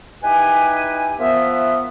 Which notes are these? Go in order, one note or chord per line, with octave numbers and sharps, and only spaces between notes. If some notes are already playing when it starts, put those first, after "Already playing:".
D#4 E4 G4 B4 G5 G#5
F3 B3 A#4 E5